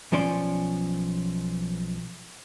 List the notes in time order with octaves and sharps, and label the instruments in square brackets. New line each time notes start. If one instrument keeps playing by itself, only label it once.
[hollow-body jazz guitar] B1 F3 C#4 D5 C6